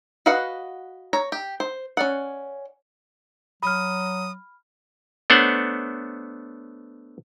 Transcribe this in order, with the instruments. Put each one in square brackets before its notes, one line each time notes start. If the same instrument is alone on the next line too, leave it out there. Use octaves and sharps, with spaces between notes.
[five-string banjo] F#4 B4 D#5 F5 F#5
C#5 A#5
G4
C5
C#4 D5 F#5
[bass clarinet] F#3 [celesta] B5 F6 [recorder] D#6
[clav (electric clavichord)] A3 B3 D4 C5 C#5 F#5